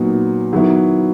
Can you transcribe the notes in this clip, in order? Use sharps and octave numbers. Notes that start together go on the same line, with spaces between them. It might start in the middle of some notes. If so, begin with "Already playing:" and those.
Already playing: A#2 F#3 B3 D#4
D#3 F#3 B3 E4